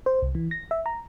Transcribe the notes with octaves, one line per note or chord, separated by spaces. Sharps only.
C5
C2
E3
A#6
E5
A#5